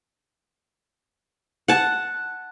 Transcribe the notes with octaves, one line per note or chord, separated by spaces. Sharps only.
F#5 A5